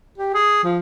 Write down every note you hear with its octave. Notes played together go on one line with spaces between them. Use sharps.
G4
G#4
F3